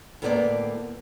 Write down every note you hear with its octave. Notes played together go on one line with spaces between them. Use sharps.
D2 A2 A#3 B3 B4 D5